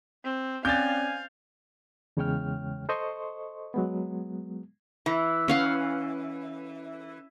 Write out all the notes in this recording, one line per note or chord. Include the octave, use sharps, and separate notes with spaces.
C4
C4 C#4 D5 F5 G#5 G6 A6
E2 C#3 G#3 C#5 G5 F6
A4 C5 D#5 C6 C#6
F#3 G#3 B3
E3
C#4 F5 F#5